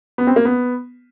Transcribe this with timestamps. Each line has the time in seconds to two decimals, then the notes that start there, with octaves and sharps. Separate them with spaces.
0.18 B3
0.27 C4
0.36 A#3
0.45 B3